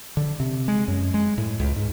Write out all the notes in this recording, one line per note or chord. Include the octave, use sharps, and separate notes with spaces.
D3
C3
G#3
F#2
G#3
A2
C#2
G#2